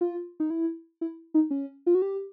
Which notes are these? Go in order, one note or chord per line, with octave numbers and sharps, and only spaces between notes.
F4
D#4
E4
E4
D#4
C#4
F4
F#4
G4